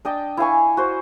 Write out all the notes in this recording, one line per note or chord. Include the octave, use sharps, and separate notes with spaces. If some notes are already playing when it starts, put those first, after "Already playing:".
D4 D#5 G5 A5
E4 F5 G#5 C#6
F#4 C5